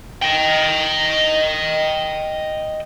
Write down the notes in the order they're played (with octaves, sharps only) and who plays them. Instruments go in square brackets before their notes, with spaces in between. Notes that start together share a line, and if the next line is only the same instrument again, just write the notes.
[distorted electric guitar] D#5 G5